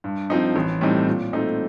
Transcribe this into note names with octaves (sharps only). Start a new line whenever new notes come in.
G2
F3 C4 D#4
A1
A2 G3 C4 D#4
A#2
A3 C4 D#4